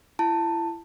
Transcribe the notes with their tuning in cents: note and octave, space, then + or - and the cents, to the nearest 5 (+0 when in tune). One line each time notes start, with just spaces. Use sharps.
E4 +30 A5 +15